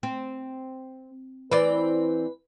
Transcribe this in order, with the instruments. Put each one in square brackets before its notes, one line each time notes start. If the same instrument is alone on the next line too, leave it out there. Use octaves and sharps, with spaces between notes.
[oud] C4
[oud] E3 C4 D5 [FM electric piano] B4